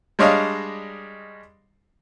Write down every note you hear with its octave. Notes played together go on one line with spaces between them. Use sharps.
G3 G#3 D4 C#5 D#5 F5